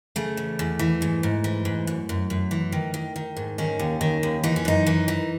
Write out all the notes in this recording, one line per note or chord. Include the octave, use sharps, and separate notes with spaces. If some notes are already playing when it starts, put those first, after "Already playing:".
C#3 A3
E2
E2
E3
G#2
G#2
E3
G#2
F#2
F#2
F#2
E3
D#3
D#3
D#3
G#2
D#3 C#4
D#2
D#3
D#2
E3 D#4
C#4
F#2 D#4
E3
E3